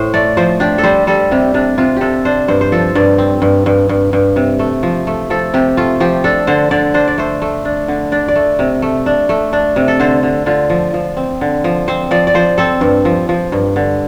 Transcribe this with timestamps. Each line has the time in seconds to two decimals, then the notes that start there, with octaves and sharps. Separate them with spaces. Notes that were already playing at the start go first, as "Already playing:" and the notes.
Already playing: A2 C5
0.14 A3 D5
0.37 F3 C5
0.60 D4 G4
0.78 A4
0.83 G3 C5
1.07 G3 A4
1.31 C3 G4
1.54 C3 D4
1.78 C3 F4
1.97 C3 G4 A4
2.25 D4 C5
2.48 G2 C5
2.61 C5
2.72 F3 A4
2.95 G2 D5
3.18 C4
3.42 G2
3.66 G2
3.89 G2
4.13 G2
4.36 C3
4.59 A3
4.83 F3
5.07 A3
5.30 F3 A4
5.54 C3 G4
5.77 A3 F4
6.00 F3 G4
6.24 D4 A4
6.47 D3 C5
6.71 D3 D5
6.94 D4 C5
7.08 D5
7.18 A3 C5
7.42 A3
7.65 D4
7.88 D3
8.12 D4 D5
8.28 D5
8.36 A3
8.59 C3
8.82 A3
9.06 D4
9.29 A3
9.53 D4
9.76 C3
9.88 A4
10.00 D3 C5
10.23 D3
10.46 D3 F4
10.70 F3
10.94 F3
11.17 C4
11.41 D3
11.64 F3
11.88 C4 C5
12.11 F3 D5
12.27 D5
12.34 F3 C5
12.58 C4 A4
12.81 G2
13.05 F3
13.29 F3
13.52 G2
13.76 D3